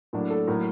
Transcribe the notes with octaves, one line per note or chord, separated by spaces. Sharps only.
A2 F#3 A#3 D4
A4
A2 F#3 A#3 A#4